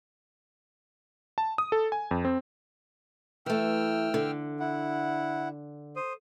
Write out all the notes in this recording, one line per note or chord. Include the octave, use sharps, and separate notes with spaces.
A5
D#6
A4
G#5
F2
C4
E3 A3 G5 E6 F6
D3
E4 F#5
C5 D#6